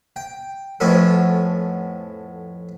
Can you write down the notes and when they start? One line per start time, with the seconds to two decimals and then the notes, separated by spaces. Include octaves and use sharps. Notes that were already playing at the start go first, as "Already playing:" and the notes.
0.16 G5
0.80 F2 A2 B3 C#4 A4